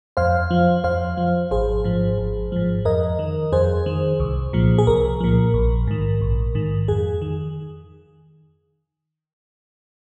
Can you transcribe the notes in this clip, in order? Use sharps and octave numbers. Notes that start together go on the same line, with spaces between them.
F2 C5 F5
F3
F2 C5 F5
F3
G#1 G#4 C5
G#2 F3
G#1
G#2 F3
F2 A#4 D#5
D#3
F2 G#4 C5
D#3
C2
A#2 F3
G#4
C2 A#4
A#2 F3
A#1
G#2 D#3
A#1
G#2 D#3
F2 G#4
D#3